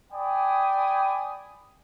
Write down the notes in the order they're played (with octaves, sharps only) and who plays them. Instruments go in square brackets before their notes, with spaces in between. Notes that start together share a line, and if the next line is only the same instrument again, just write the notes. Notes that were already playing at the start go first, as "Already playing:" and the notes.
[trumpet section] D5 G5 G#5 B5 D#6